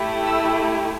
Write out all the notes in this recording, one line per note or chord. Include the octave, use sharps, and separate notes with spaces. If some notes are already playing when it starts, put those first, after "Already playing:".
Already playing: A3 E4 G4
E6